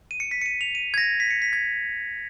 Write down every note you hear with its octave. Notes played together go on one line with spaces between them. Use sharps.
D#7
C#7
B6
C#7
D#7
F7
D#7
G#6
A#6
B6
C#7
B6
G#6